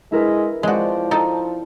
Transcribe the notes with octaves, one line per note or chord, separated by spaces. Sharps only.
G#3 E4 A#4 B4
F3 G#3 C4 F#4 D5
D#4 A4